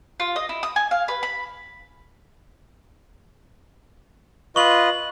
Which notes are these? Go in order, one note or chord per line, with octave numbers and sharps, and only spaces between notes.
F4
D#5
E4
D#6
G#5
F5
B4
B5
F4 B4 D#5 C#6 F#7